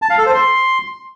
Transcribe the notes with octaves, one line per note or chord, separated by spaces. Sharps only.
A5
F5
A4
C5
C6